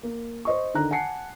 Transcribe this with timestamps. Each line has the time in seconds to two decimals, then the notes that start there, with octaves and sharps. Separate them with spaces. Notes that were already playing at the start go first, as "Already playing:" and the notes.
0.03 A#3
0.45 C5 D#5 C#6
0.74 D3 D#3 A#5 F#6
0.91 F#5 G#5 A5 C7 C#7